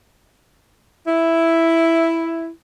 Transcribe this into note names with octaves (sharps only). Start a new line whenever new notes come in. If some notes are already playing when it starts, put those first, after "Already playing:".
E4